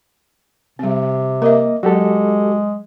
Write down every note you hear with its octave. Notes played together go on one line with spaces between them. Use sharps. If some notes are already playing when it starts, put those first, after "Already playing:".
C3 G3 C4
A#3 A#4 D#5 E5
F#3 G#3 F#4 G4 A4